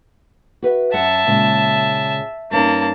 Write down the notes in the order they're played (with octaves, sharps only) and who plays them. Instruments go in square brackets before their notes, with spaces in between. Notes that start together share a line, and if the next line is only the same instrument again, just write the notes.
[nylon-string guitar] F#4 B4 E5
[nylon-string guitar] F#2 F#5 [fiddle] E5 A5
[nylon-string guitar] A#2 C#3 G#3
[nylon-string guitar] G2 C#4 D#4 [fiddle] A#3 A5